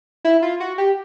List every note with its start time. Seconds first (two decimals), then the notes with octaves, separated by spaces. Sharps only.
0.25 E4
0.42 F4
0.60 F#4
0.78 G4